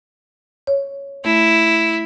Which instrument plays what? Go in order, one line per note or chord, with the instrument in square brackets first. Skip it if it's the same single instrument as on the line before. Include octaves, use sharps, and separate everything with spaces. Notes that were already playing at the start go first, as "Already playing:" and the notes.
[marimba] C#5
[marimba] A3 [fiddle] E4